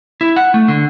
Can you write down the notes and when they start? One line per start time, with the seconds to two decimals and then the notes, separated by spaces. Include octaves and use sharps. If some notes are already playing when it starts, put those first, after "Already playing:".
0.21 E4
0.36 F#5
0.54 A3
0.68 D3